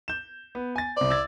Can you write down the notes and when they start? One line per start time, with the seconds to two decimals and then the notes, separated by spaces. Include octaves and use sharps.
0.08 G6 E7
0.55 B3
0.76 G#5 A6
0.97 C2 C5 D5
1.10 E6 G#6 A6